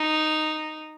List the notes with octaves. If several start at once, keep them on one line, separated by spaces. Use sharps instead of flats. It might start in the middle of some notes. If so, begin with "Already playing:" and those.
Already playing: D#4